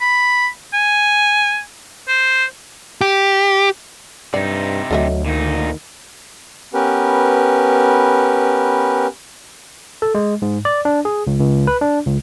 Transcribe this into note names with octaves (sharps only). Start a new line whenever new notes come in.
B5
G#5
C5
G4
G2 C3 D#4 D5
D2 F#3 A3 D#5 E5
A#2 D#3 D#4
B3 C#4 G4 A#4 B4
A4
G#3
G#2
D5
D4
G#4
C#2
C#2
B4
D4
C#2